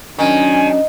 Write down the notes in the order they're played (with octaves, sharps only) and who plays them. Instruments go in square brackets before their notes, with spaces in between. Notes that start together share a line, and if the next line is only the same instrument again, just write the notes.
[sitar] D#3 [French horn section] F#3 D4 [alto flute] C#4 [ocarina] G#5